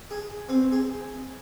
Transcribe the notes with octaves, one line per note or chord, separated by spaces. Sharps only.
G#4
C4
G#4